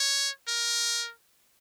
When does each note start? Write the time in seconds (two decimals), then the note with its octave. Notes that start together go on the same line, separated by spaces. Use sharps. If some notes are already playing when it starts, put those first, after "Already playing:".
Already playing: C#5
0.48 A#4